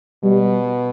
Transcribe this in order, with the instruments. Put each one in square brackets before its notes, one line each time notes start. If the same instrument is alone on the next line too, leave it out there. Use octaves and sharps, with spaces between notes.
[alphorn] B2 [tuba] G3